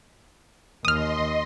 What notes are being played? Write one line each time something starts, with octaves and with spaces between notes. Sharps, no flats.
D#2 D#5 C6 D#6 F6